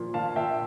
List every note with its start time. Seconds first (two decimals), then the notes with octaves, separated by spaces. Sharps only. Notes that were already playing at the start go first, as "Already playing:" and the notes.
Already playing: A#2 F3
0.14 A#2 F5 A5
0.36 A#2 E5 G5